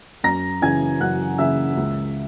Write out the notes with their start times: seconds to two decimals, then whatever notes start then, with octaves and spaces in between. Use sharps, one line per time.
0.24 F#2 A#5 A#6
0.62 C#3 E3 G#5 G#6
1.00 F#2 F#5 F#6
1.38 C#3 E3 E5 E6
1.77 C#2